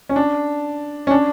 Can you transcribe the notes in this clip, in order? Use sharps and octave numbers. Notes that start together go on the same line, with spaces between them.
C#4
D4
C#4
D4